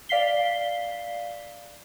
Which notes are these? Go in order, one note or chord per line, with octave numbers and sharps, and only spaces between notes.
D5 F5 B6 C7 G7